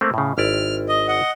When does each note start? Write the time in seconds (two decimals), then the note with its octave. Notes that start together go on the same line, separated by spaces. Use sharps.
0.01 A3 A#3 C4
0.14 A2 C#3
0.38 G#1 E4 D5 F6
0.89 D#5
1.08 D#5 F#5